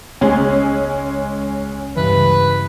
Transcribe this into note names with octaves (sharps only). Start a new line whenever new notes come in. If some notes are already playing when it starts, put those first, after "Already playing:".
C#2 G#3 C#4
G2 C#3 E3 B4